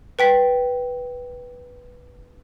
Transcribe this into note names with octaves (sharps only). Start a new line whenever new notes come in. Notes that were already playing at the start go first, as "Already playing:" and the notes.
B4 G5 B6